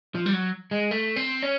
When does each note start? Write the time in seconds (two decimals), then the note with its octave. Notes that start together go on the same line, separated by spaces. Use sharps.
0.15 F3
0.26 G3
0.33 F#3
0.71 G#3
0.91 A3
1.16 C4
1.42 C#4